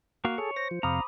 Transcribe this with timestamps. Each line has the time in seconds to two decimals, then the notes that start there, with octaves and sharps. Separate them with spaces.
0.25 A#3 F#4 F5
0.38 G#4 A4 C#5
0.56 C5 A#6 C#7
0.71 F3
0.83 F2 C3 F5 A#5 B5 D6 D#6